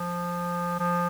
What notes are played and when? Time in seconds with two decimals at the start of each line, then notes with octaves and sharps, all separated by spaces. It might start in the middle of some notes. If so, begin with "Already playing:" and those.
Already playing: F3
0.79 F3